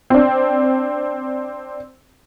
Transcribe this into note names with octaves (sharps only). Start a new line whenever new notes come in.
C4 D4